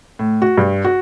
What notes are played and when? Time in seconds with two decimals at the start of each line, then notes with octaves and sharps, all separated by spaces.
0.19 A2
0.42 F#4
0.58 G2
0.85 F#4